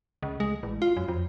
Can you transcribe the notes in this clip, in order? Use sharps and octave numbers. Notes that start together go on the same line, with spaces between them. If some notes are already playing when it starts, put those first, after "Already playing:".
C#2
G#3
A1
F4
F#2
F2